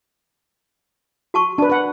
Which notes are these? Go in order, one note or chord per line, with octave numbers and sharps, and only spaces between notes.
F#4 A5 C#6
D4 B4 A5
B4 F#5